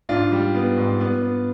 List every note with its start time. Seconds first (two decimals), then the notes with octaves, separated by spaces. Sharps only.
0.09 G#2 D4 F4
0.32 G3
0.55 B3
0.77 G#2
1.00 B3
1.22 B3